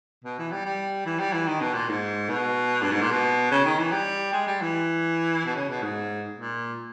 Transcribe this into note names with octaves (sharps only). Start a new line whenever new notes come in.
B2
E3
G3
G3
E3
G3
E3
D#3
B2
A#2
G#2
B2
G2
G#2
A#2
B2
C#3
D#3
E3
G3
G#3
G3
E3
B2
C#3
B2
G#2
A#2